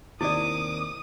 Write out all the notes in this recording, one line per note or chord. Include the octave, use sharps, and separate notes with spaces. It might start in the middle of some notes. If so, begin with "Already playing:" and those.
D#2 C3 D#3 E4 D5 D6 D#6